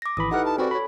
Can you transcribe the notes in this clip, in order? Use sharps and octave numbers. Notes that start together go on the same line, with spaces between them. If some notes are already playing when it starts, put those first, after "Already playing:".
D6 A#6
G#1 E3 B5 D#6
D#4 E4 G4 A4 B4 F#5 F6
A5
C4 F#4 A4 B4 D5 G#5
C#5 B5